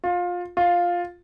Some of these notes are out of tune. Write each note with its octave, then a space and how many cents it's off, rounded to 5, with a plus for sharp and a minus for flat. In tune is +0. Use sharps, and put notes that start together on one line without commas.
F4 +20
F4 +5